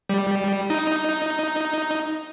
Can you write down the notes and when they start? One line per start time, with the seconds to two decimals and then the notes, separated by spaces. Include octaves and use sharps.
0.09 G3
0.70 D#4